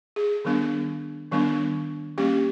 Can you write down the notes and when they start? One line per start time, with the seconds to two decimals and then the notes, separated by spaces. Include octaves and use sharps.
0.16 G#4
0.45 D#3 G3 B3 D4
1.31 D#3 G3 B3 D4
2.18 G3 A#3 C#4 G4